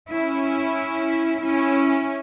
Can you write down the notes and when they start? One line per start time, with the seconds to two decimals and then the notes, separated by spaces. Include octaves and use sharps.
0.11 C#4 E4
1.40 C#4 E4